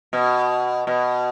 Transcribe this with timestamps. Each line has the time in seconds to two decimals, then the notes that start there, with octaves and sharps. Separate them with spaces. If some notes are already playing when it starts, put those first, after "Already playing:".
0.13 B2
0.87 B2